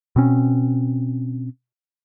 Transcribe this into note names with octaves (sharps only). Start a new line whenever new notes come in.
B2 C4 C#4